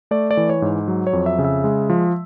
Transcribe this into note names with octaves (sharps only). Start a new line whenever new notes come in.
A3 D5
D5
E3
C#5
G#2
F#3
C#5
F2
E5
C#3
E5
G#3
F3